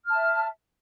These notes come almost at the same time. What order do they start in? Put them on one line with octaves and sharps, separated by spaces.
F6 A5 E5